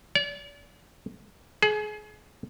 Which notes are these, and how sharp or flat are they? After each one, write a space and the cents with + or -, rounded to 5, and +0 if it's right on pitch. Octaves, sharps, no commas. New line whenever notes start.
D5 -40
G#4 +30